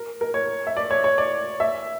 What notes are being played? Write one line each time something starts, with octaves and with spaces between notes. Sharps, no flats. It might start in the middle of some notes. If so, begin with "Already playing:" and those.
Already playing: A#4
A#4
C#5
E5
D5
C#5
C#5
D5
E5